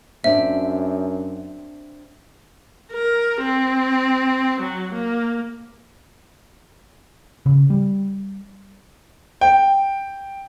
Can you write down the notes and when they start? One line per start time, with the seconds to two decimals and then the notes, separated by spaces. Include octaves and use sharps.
0.24 F#2 C4 D4 E5
2.92 A#4
3.42 C4
4.60 F#3
4.94 A#3
7.46 C#3
7.70 G3
9.41 G5